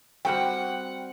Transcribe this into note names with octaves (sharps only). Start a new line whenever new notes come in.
G3 C4 F#4 F#5 G5